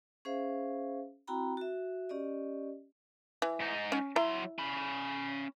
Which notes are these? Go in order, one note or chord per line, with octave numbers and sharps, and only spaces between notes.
C#4 G#4 C5 E5 F5
C4 E4 F#4 G5 A#5 B5
F#4 E5
C#4 G4 D5 D#5
E3
G#2 D#4
C#4
F#3 E4 A#5 C6
C#4 B5